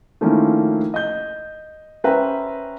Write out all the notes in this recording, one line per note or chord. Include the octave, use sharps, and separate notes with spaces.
D#3 F3 A3 A#3 C#4 E4
D#5 G6
C#4 B4 C5 E5 G5 A#5